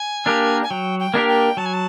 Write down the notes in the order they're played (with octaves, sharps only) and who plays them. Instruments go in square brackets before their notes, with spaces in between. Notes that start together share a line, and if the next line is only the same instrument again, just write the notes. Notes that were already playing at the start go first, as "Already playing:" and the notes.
Already playing: [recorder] G#5
[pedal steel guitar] A#3 D4 G4 A#4
[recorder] G#5
[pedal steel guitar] F#3 [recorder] G5
[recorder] G5
[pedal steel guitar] A#3 D4 G4 A#4
[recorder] G5
[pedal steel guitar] F#3 [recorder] A5
[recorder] G#5
A5